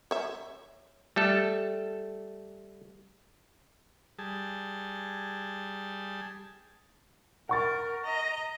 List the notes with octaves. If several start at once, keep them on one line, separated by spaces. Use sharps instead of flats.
C#5 E5
G3 A3 A4
G3 G#4 A5
A#4 F#5 C#6 A6
D#5 A#5